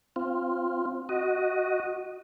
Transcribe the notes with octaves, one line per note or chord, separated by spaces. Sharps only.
C4 F4
F#4 D#5